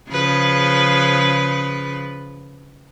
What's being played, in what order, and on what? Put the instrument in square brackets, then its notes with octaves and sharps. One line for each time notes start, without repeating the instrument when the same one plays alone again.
[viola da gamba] C#3 F3 B4